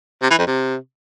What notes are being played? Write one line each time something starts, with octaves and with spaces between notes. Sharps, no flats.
C3
E3
F2
C3